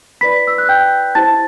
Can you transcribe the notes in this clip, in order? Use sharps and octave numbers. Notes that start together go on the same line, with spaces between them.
E4 B4 D5 B5 B6
E6
F#6
G5 G6
E4 G4 C5 A5 A6